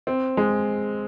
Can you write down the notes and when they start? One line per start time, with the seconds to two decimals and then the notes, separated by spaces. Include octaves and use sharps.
0.07 C4
0.37 G#3